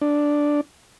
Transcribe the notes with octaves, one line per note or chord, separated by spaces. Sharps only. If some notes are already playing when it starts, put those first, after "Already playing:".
D4